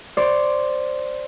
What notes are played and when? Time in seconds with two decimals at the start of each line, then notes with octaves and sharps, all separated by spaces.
0.17 C5 D5